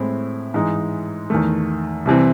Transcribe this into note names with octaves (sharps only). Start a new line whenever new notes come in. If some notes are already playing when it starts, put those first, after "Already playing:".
Already playing: A2 G#3 C4 E4
G#2 E3 G#3 D#4
E2 D#3 A3
C2 C3 E3 C4